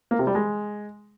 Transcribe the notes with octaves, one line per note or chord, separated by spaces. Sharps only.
A#3
C3
G3
G#3